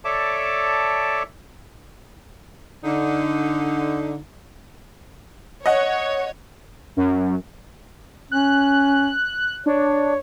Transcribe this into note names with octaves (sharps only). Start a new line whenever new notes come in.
A4 C#5 D5 E5 A5 D6
D3 D#4
C#5 D#5 F#5
F#2
C#4 F#6
D4 C#5